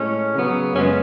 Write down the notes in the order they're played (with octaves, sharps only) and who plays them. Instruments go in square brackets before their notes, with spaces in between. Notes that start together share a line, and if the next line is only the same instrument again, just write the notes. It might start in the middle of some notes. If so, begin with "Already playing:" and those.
Already playing: [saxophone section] A2 G#3 C#4
C#3 F#3 B3
F#2 C#3 G#3 B3 C#4